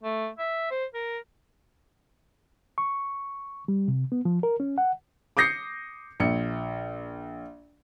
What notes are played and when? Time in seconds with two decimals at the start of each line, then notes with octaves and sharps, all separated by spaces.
0.03 A3
0.39 E5
0.71 C5
0.94 A#4
2.78 C#6
3.68 G3
3.88 C3
4.12 B3
4.25 F3
4.43 A#4
4.60 C#4
4.78 F#5
5.37 D6 D#6 G6 A#6 C7 C#7
6.20 A#1 C#7